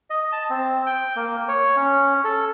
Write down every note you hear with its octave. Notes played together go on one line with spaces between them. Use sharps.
D#5
A5
C4
G5
A#3
C#5
C#4
A4